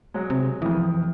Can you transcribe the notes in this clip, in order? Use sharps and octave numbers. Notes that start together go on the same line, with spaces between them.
F#3 G#3
C3
F2 E3 D#6